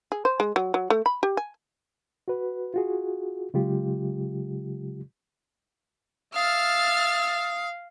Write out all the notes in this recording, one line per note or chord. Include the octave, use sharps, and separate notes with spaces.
G#4
C5
G#3
F#3
F#3
A3
B5
G4
G#5
F#4 B4
F4 F#4 G#4
C#3 F#3 G#3 F4 G4
E5 F5 D#6 F6 A6